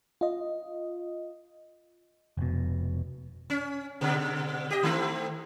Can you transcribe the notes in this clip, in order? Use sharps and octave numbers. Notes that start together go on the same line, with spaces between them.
F4 D#5
F1 B2
C#4
G#2 B2 D3
G4 D#5
D#3 A3 C4